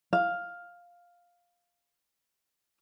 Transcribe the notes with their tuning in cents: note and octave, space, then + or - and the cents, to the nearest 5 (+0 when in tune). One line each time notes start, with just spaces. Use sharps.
F5 +5